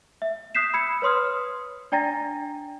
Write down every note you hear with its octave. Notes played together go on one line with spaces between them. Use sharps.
E5
D#6 F#6 G6 B6 C7 E7
B5 E6 G#6 C#7
B4 C#5 C6 D#6 F6
D4 D5 G5 A#5 A6 A#6